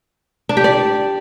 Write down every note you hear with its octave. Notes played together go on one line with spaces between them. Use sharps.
D4
G4
D5